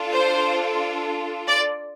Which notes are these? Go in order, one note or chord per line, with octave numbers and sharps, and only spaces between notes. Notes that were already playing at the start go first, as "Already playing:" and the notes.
Already playing: D4 F4 A4
C5
D5